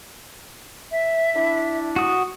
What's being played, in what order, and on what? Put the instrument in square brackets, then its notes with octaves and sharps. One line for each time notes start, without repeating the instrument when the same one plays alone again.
[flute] E5
[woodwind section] D4 E4
[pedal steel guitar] F#4 D#6